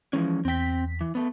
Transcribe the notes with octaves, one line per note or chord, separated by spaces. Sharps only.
E3 F3 G#3 C#4
E2 C4 G5 B6
E3
A3 B3